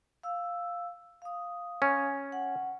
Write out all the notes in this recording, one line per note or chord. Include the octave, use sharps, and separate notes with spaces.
F5 E6
F5 D#6
C#4
F#5